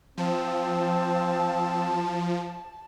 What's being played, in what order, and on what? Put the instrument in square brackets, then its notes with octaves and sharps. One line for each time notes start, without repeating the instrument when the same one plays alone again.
[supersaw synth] F3 [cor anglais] C4 [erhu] A5